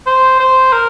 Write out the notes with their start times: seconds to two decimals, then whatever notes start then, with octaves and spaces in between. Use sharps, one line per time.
0.07 C5
0.40 C5
0.73 A#4